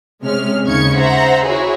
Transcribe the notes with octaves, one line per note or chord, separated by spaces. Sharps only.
C3 G#3 C#4 F6
D#2 C#3 D#4 C#6 G#6 C#7
C5 E5 F#5 A#5
E4 F#4 G#4 C#5